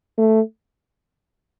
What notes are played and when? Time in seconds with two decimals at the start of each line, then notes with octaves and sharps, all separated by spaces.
0.18 A3